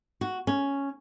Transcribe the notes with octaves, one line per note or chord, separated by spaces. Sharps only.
F#4
C#4